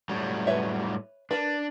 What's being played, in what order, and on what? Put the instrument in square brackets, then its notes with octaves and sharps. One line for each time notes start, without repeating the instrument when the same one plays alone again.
[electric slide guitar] A2 F#3 G3
[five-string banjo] B4 C#5 E5
[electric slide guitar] D4 [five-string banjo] A#4 B4